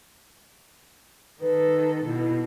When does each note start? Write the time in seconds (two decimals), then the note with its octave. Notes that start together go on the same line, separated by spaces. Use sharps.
1.41 D#3 A4 B4
2.06 B2 E4